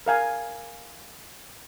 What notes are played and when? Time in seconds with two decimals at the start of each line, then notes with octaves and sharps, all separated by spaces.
0.06 A#4 F5 G#5